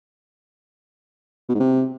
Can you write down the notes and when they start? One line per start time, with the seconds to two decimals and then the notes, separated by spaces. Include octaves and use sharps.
1.49 B2
1.55 G#2
1.60 C3